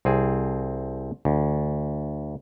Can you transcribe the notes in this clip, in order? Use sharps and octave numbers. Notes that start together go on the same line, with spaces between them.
C2 C4 G#4
D2